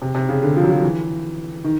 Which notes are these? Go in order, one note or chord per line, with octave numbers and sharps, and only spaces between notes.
C3
C3
C#3
D3
F3
F#3
F3
E3
D#3